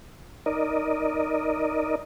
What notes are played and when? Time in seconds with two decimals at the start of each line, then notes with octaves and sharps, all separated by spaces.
0.46 D#4 A#4 D5 D#5